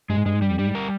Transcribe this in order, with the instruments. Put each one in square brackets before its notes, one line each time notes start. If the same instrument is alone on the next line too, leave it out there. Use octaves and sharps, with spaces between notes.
[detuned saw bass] G2 [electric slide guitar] G#3
[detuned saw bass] G#2
[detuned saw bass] G2 [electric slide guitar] G#3
[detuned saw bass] G#2
[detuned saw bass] G2 [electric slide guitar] G3
[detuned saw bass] F2
[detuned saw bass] G2 [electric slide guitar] G3
[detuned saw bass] G#2
[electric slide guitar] A#4